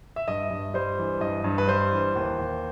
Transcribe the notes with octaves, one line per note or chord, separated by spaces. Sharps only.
E5
G2 D#5
G2
G3 C5
E3
G2 D#5
G2
B4
G3 C5
E3
D#2
D#2